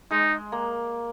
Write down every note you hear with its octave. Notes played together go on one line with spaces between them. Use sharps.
G#3 D#4
A#3